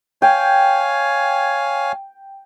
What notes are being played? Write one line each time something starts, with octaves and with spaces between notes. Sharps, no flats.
C#5 F5 G5 G#5